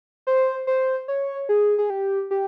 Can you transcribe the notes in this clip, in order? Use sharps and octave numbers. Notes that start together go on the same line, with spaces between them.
C5
C5
C#5
G#4
G#4
G4
G4